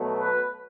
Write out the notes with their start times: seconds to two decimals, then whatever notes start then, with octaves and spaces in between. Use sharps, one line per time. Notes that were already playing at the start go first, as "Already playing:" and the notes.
Already playing: B2 F#3 A3
0.20 B4